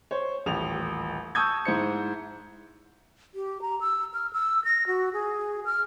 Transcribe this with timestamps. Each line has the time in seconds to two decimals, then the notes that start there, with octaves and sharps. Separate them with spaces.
0.11 C5 C#5
0.46 D#1 A1 G4 F7
1.35 A5 C#6 D#6 E6 G6 G#6
1.65 G#2 E4 C5 C#7
3.35 G4
3.62 A#5
3.81 E6
4.14 F6
4.33 E6
4.65 A#6
4.87 F#4
5.13 G#4
5.65 F6